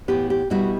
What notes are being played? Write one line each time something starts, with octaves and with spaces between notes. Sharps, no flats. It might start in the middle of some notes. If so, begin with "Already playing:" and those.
A2 E3 B3 G4
G4
B2 G3 B3 E4 F#4